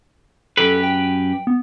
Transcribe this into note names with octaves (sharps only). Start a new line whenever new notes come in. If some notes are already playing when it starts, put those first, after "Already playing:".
F#2 G4 A4 B4
G5
B3